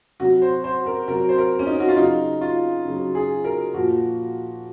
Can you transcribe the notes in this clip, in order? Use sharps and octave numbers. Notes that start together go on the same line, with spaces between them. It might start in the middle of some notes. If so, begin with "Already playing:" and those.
C3 F#3 F#4
C5
C5
A#4
C3 F#3 A#4
C5
A#4
C#4
D#4
F#4
F4
C#3 F#3 D#4
F4
C#3 F#3
G#4
A#4
A#2 F3 F#4